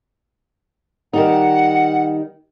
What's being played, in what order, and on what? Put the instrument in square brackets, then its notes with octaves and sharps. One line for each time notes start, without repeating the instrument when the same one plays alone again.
[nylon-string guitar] D#3 G3 D#4 [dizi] F#5